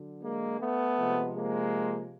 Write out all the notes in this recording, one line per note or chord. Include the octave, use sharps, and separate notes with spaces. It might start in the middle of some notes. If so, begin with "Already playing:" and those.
Already playing: D3 F#3
G#3 A#3
A3 B3
C3 F3 G#3
G#3 A#3